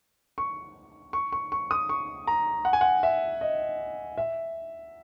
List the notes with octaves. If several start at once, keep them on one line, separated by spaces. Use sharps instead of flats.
C#6
C#6
C#6
C#6
D#6
C#6
A#5
F#5
G#5
F#5
E5
D#5
E5